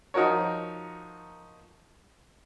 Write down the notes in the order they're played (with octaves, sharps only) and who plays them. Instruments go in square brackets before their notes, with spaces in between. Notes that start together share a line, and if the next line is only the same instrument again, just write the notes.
[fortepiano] F3 D#4 F#4 A#4 C#5